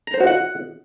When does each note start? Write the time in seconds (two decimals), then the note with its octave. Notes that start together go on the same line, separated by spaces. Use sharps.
0.07 A#5
0.14 C5
0.20 F#4
0.27 F#5